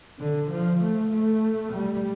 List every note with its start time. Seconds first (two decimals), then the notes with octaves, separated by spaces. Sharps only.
0.19 D3
0.50 F3
0.81 A3
1.12 A3
1.73 G3